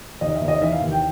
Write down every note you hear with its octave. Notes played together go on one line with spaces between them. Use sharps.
D#2 D#5
E5
D#2
D#5
E3 E5
F5
D#2
G5